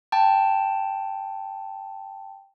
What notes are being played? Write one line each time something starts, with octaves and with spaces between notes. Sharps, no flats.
G5 A5